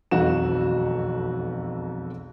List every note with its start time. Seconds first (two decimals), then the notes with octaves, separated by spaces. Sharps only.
0.11 E1 B1 F2 F#4 F5 E7